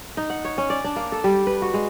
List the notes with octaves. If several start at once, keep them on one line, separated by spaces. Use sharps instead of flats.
D#4
F#5
C#5
C#4
D5
D4
A#3
A4
G3
B4
F#4
G#3